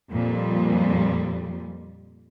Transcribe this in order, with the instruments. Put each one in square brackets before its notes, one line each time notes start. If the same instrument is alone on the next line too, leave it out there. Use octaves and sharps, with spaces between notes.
[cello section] F2 A#2 G3